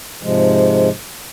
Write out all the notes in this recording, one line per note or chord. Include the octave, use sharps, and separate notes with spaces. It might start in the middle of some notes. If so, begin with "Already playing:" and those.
G#2 C3 F3 G#3